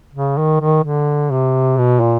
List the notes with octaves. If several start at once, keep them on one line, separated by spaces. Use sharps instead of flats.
C#3
D#3
D#3
D3
C3
B2
A#2